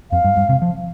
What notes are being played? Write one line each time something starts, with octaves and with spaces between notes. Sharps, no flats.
F2 F5
G2
G2
C3
F3